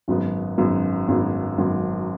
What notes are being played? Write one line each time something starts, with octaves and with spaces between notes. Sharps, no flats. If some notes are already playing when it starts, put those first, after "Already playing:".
G#1 F#2 C#3 F#3 B3
G#1 F#2 C#3 F#3 B3
G#1 F#2 C#3 F#3 B3
G#1 F#2 C#3 F#3 B3